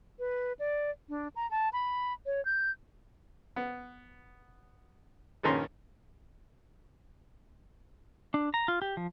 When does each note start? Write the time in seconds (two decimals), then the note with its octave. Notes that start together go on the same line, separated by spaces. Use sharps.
0.19 B4
0.59 D5
1.09 D4
1.36 A#5
1.51 A5
1.73 B5
2.26 C#5
2.45 G6
3.56 B3
5.43 A#1 G2 D#3 C#4 A#5 C6
8.34 D4
8.54 A#5
8.68 F4
8.82 G4
8.97 F3